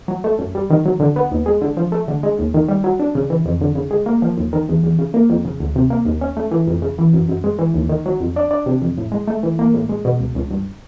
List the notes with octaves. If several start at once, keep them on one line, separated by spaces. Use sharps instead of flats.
F#3
A3
F#2
G3
D#3
F#3
D3
B3
D#2
G#3
D3
F3
A3
D3
G#3
D#2
D#3
G3
F#3
D4
C#3
E3
F2
D3
C#3
G#3
A#3
F3
D#2
D#3
E2
E2
C#3
A#3
F2
C#3
D2
C3
A#3
D#2
C#4
A3
E3
F2
C#3
E3
F#2
F#2
G#3
E3
D#2
D#3
F#3
F2
D4
D4
C3
F2
A2
G#3
A3
E3
A#3
A2
G#3
B2
C#2
C#2
G2